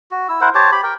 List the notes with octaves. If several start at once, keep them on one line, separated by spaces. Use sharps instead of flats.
F#4
E4 E6
E4 A#4 C5 F#5
G4 C5 C#5 A5
G4 B5
A#4 G5